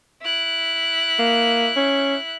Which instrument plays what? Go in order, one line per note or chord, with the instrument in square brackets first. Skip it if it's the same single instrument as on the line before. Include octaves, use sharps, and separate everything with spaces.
[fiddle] E4 F#6
[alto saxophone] A#3
C#4